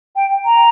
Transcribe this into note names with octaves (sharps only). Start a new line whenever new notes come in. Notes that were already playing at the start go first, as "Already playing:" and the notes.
G5
A#5